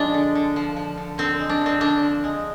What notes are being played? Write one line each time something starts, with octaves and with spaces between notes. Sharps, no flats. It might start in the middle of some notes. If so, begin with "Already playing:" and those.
Already playing: F3 G#3 D4
D3
D3
F3
F3
D3
D3 C4
G#3
D4
F3 C4
D3 D4
F3
G#3